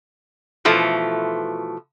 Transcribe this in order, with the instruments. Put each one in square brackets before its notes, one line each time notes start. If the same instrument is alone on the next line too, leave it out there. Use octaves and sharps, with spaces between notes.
[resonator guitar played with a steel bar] B2 E3 F3 A3